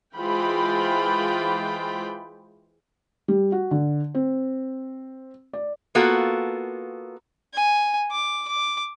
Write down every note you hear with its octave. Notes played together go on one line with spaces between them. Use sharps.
E3 G#3 F4 C5 G5 B5
G3
F#4
D3
C4
D5
A#3 B3 F4 F#4 A4
G#5
D6
D6